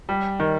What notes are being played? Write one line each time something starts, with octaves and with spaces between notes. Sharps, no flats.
G3
D#3